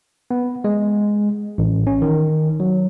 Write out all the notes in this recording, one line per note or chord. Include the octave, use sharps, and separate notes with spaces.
B3
G#3
A1
C#4
D#3
F#3